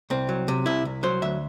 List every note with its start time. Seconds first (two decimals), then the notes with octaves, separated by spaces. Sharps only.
0.10 C2 C4
0.29 F#3
0.48 C3
0.66 C2 E4
0.85 C2
1.03 F#3 C5
1.22 D2 E5